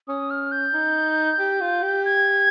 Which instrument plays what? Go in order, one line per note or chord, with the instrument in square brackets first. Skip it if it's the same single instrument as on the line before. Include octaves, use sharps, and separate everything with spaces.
[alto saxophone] C#4 [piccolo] D#6
[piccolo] F6
G6
[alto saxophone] D#4
G4
F4
G4
[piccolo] G#6